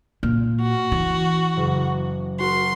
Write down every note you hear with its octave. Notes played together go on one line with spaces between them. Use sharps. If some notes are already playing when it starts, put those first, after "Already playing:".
A#2 F6
F#4
E3
F#1
F#4 A#4 C6